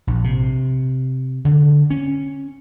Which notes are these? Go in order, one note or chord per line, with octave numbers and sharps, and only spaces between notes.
A#1
C3
D3
C#4